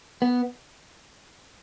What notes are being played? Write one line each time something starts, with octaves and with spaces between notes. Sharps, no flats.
B3